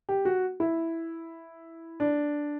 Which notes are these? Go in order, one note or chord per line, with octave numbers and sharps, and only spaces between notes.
G4
F#4
E4
D4